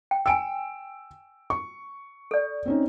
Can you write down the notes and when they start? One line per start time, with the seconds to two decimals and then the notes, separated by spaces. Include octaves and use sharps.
0.11 G5
0.26 G5 G#5 E6 D7
1.50 C#6
2.31 A4 D5
2.65 C4 C#4 D#4